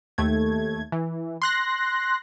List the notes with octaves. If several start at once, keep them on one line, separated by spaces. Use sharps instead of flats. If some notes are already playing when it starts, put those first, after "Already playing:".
D#2 A3 G#6
E3
C6 F#6 A#6